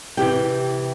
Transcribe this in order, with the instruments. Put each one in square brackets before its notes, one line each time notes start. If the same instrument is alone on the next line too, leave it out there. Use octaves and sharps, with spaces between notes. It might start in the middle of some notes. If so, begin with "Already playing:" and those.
[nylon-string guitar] C3 E3 G4 G5